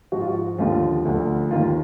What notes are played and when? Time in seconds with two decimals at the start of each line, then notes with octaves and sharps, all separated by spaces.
0.12 G#2 F3 F#4
0.20 F4
0.28 F#4
0.58 D#2 D3 F3 F4
1.05 D2 D3 F3
1.51 D#2 D#3 F4